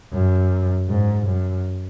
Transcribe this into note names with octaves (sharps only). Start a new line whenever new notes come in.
F#2
G#2
F#2